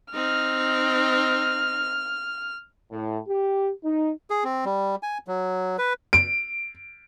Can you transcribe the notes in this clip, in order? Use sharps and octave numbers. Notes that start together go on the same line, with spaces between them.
C4 D#4 F6
A2
G4
D#4
G#4
C4
G3
G#5
F#3
B4
D7